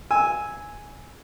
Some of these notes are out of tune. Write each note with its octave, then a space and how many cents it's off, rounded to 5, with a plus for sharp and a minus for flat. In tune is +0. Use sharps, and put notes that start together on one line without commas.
G#5 +0 E6 -15